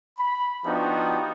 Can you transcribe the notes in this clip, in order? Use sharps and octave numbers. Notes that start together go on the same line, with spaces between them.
B5
F3 B3 D4 D#4 F#4 G4